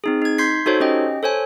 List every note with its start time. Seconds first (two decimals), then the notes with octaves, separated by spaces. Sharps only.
0.04 C4 D#4 G#4
0.22 D#4 G#6
0.38 C6 G6 G#6 B6 C7
0.66 D#4 F#4 A4 C5 C#5
0.80 C#4 G4 D#5 G5
1.23 A4 C5 C#5 G#5